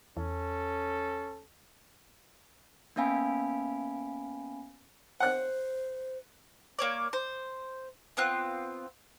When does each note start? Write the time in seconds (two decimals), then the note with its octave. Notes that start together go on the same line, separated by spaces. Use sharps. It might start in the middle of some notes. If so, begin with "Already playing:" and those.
0.17 E2 C#4 A4
2.96 A#3 B3 C#4 F5 G#5 B5
5.20 C5 F#5 F#6
6.79 A#3 C#5 D5
7.13 C5
8.17 B3 C4 F4 F#6